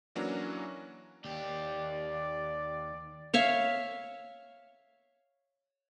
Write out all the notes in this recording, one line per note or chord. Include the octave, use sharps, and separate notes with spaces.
E3 F#3 A#3 C#4 D4 F#4
D#2 G4 D5
C#5 E5 F5